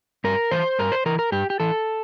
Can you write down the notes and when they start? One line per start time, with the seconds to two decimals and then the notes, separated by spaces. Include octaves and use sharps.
0.24 G2 A#4
0.51 E3 C5
0.79 G2 A#4
0.92 C5
1.06 E3 A#4
1.19 A#4
1.32 G2 G4
1.50 G4
1.60 E3 A4